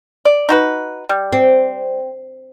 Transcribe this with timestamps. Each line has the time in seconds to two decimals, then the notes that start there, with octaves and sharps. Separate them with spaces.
0.25 D5
0.49 D#4 F#4 B4
1.09 G3
1.32 C4